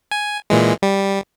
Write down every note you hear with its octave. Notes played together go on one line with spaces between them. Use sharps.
G#5
A#2 E3 G#3
G3